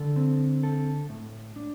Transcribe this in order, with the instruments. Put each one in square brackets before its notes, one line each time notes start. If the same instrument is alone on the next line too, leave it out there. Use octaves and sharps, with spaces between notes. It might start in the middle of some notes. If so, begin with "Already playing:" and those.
Already playing: [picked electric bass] D3 [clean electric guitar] A4
[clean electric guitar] C4
A4
A2
D4